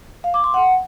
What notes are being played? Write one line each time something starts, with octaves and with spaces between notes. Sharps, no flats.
F5
D6
C6
F#5